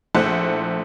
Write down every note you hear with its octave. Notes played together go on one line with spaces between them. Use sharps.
A#1 A3 E4 C5 F#5 F#6